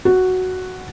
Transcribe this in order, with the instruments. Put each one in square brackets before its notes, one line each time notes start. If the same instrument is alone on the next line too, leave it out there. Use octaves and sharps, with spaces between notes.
[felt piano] F#4